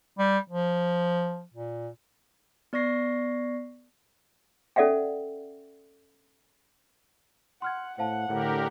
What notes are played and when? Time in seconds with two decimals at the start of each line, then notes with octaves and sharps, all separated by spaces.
0.19 G3
0.50 F3
1.54 A#2
2.73 B3 D5 C#6 A#6 C7
4.76 C#4 A4 D5 E5 F#5 G5
7.62 F#5 C6 F6 G#6
7.98 A2 C5 F5 F#5 A5
8.29 A2 D3 G4 A#4